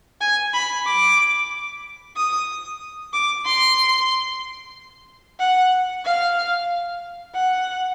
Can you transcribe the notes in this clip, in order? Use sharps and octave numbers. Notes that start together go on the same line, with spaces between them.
G#5
B5
D6
D#6
D6
C6
F#5
F5
F#5